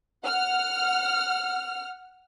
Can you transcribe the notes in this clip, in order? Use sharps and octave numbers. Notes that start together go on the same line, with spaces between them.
F#5 F6